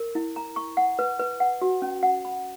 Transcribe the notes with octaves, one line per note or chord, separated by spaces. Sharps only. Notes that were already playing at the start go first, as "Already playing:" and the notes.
Already playing: A#4
E4
A#5
C#6
F#5
B4
B4
F#5
F#4
C#4
F#5
B5